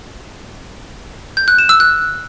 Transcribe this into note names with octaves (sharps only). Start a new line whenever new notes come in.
G6
F#6
E7
E6
F#6